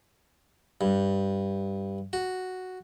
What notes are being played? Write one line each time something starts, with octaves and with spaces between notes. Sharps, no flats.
G2
F#4